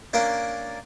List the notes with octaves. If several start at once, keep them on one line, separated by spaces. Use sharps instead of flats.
A#3 C#4 D4 D5